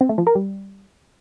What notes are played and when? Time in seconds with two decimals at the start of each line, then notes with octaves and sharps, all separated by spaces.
0.01 C4
0.09 A3
0.18 F3
0.27 A#4
0.35 G3